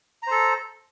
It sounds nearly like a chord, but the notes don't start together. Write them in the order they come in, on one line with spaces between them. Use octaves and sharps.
A#5 C5 A4